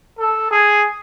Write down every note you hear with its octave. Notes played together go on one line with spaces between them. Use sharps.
A4
G#4